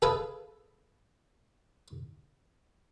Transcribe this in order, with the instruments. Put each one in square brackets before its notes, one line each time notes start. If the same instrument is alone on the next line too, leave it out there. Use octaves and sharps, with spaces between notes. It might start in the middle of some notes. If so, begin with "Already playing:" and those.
[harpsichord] G#4 A4 B4 E5 F5 G#5